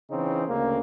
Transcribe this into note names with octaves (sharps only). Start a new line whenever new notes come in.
C#3 E3 C4 D#4
D2 C#3 A#3